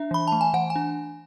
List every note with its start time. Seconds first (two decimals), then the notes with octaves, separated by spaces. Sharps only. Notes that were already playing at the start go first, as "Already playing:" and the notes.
Already playing: D4 E5
0.11 E3 B5
0.28 A3 A5
0.41 G#5
0.54 E3 F#5
0.70 G#5
0.76 D4